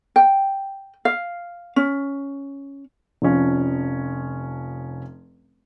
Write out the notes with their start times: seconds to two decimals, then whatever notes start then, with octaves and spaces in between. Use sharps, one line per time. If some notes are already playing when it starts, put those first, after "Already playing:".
0.16 G5
1.05 F5
1.76 C#4
3.22 F1 F3 C#4